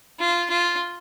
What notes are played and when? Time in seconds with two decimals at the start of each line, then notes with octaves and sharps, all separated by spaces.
0.20 F4
0.50 F4